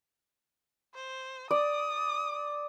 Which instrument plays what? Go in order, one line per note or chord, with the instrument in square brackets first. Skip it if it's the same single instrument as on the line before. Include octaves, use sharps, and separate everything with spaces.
[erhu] C5
[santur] D5 [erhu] D#6